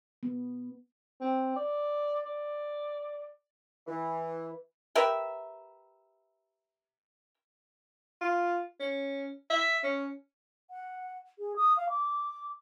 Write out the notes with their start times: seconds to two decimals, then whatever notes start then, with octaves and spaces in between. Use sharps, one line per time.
0.23 B3
1.21 C4
1.56 D5
2.25 D5
3.87 E3
4.95 G4 A#4 B4 E5
8.21 F4
8.80 C#4
9.50 E5
9.84 C#4
10.71 F#5
11.39 G#4
11.56 D#6
11.77 F5
11.90 D6